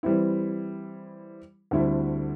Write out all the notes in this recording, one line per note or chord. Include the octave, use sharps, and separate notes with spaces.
E3 G3 C4 E4
D2 D3 G3 C4 E4